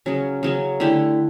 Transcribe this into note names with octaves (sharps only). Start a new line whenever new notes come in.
C#3 F#3 C#4
C#3 F#3 C#4
D3 A3 E4 G4